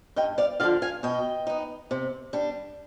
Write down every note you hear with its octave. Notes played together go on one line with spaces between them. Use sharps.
G2 D#5 G5
D5 F5
D3 F3 D5 F5
F5 G#5
B2 D#5 G5
B3 D#4
C3
G3 D4